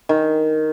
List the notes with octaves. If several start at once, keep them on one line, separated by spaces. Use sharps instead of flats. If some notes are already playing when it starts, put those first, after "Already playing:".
D#3